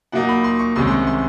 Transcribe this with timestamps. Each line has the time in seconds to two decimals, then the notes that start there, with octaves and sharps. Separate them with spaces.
0.12 A#2 F#3 A#3 D#4 F#5
0.29 B5
0.44 C6
0.59 C#6
0.76 C2 C3 D#3 G#3 C#4 C6
0.87 C6
0.91 C#6
1.07 C6